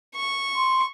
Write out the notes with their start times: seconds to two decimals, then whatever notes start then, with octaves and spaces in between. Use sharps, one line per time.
0.15 C#6
0.56 C6